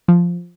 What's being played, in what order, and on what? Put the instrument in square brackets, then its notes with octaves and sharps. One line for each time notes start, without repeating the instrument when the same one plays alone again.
[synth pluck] F3